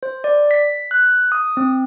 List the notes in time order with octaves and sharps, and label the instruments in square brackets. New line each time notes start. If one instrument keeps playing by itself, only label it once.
[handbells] C5
D5
B6
F#6
D#6
C4